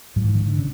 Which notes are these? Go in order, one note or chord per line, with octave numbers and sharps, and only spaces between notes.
G#2 F#3
E3
D#3
D3
C#3